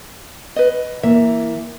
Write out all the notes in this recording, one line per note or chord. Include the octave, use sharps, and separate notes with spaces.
B4 D#5
E3 A#3 E5